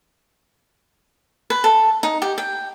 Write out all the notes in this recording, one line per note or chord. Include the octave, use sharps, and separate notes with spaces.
B4
A4
D#4
G4
G5